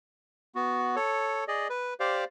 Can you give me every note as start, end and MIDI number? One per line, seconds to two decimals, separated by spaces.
0.55 0.96 59
0.55 0.96 66
0.96 1.44 69
0.96 1.44 73
1.48 1.68 68
1.48 1.68 74
1.48 1.68 75
1.70 1.94 71
2.00 2.24 67
2.00 2.24 72
2.00 2.24 74
2.00 2.24 77